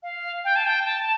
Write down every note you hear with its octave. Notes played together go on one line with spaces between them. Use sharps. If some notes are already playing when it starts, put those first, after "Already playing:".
F5
G5
A5
G5
A5